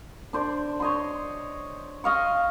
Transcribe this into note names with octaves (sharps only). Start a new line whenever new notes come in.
D4 C5 D5
C#5 D#5 C6
D#5 F5 C#6